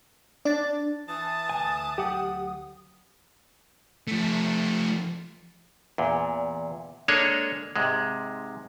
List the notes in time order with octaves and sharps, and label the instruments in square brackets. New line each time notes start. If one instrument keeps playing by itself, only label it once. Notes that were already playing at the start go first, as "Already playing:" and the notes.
[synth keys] D4 [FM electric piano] D5 A6
[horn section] E3 A5 [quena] D#6
[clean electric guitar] D2 D#3 G#5
[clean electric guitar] D2 F#3 F#5 [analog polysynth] G4
[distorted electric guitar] F3 A3
[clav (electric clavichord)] E2 A#2
G#3 A#3 D4 G#4 A4 C#5
G#2 C3 G#3